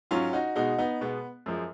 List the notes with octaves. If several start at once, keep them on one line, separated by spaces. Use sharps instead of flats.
G#2 F#3 C#4 F4
D#4 F#4
B2 G#3 D#4 F#4
B3 D#4
B2 G#3 B3
F#2 F3 G#3